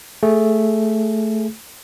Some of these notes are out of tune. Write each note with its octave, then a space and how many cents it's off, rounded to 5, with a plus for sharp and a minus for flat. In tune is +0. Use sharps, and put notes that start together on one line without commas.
A3 +0 G#4 +10